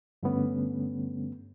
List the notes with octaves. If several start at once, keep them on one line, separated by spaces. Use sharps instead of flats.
G2 D3 G3 A3 B3 C#4